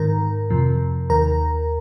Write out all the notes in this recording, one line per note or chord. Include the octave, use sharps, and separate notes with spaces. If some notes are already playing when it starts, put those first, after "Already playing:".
Already playing: G#2 D#3 A#4 A#5
F2 C3 F3
D#2 D#3 A#4 A#5